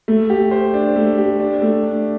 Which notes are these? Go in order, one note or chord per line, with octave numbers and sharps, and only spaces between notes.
A3
G4
C5
D4
A3
G4
D4
A3
D4